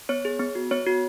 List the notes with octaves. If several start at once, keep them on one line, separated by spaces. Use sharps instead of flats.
B3 C#5
G#4
B3
F#4
B3 C#5
F#4